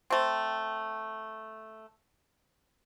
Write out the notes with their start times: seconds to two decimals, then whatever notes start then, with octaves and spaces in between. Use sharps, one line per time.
0.10 A3 C4